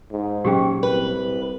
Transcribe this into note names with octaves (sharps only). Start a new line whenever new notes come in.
G#2
A#2 F#3 C#4 G4 G#4 G5
C2 B4